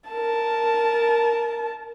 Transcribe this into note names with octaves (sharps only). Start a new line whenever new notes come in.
A#4 A5